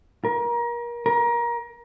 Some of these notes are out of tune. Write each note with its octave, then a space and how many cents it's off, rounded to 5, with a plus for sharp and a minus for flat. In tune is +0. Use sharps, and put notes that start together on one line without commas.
A#4 +30
A#4 +25